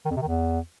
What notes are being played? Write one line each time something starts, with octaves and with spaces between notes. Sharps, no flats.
D#3
F2
C3
D#3
E2